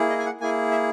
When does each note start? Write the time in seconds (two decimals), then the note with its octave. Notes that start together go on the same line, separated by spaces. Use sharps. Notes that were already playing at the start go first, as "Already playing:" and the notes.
Already playing: A#3 E4 G#4
0.10 D#5
0.19 G#5
0.26 F#5
0.40 A#3 E4 G#4 G#5
0.71 E5